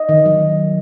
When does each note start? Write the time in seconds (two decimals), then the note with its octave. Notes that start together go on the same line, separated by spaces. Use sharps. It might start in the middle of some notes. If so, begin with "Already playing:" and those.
Already playing: D#5
0.09 D#3
0.26 F#3